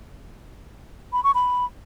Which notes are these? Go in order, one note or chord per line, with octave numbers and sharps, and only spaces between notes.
B5
C#6
B5